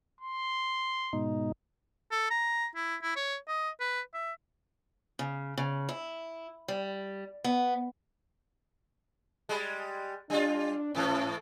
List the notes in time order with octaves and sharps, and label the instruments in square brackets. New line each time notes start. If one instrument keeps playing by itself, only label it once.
[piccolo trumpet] C6
[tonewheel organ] G#2 B2 D#4
[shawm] A4
A#5
E4
E4
C#5
D#5
B4
E5
[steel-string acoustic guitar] C#3
C#3
E4
G3
B3
[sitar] G3 G#3
[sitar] G3 F4 [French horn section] D4
[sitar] G#2 E3 A3 [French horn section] C#4